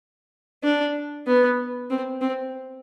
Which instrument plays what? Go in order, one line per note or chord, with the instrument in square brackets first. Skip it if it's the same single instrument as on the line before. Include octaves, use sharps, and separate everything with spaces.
[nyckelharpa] D4
B3
C4
C4